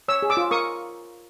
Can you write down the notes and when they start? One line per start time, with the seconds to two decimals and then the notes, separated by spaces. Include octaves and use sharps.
0.08 C#5 E6
0.22 G#4
0.30 D6 E6
0.37 F4
0.51 A#4 C#6 D#6